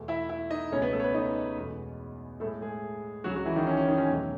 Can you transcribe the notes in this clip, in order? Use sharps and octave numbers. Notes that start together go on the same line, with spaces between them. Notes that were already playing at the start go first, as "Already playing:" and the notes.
Already playing: E2 B2 A3
E4 E5
E4 E5
D#4 D#5
C#2 B2 A3 C#4 C#5
B3 B4
A3 A4
C#5
B3 B4
D#4 D#5
E2 B2 G#3
A2 G#3 A3 A4
G#3 G#4
C#2 C#3 F#3 G#3 F#4
F#3 F#4
E3 E4
D#3 D#4
C#4
C#4
D#3 D#4
C#4
E2 B2 F#3 A3